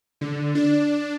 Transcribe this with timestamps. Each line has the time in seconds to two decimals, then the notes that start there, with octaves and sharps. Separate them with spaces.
0.21 D3
0.55 D4